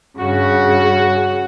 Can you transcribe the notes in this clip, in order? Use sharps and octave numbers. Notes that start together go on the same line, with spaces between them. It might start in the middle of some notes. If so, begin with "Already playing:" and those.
G2 C#3 F#4